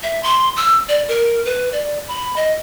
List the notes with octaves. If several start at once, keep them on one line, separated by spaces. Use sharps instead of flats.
E5
C6
E6
D5
A#4
B4
D5
B5
D#5